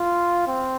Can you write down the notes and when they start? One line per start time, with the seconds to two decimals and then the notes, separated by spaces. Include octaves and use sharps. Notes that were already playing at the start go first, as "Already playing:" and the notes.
Already playing: F4
0.48 C4